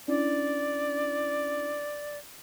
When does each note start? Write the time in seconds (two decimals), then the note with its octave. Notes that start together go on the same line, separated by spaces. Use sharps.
0.08 C#4 D4 E4 D5